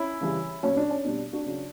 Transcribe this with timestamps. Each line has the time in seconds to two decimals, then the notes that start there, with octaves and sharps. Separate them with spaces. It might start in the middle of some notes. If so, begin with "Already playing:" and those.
Already playing: C#4 E4
0.21 C#3 E3 G3
0.63 A#2 F#3 C#4
0.77 D4
0.90 C#4
1.05 B2 G3 D4
1.33 D4 F#4
1.46 C#3 F#3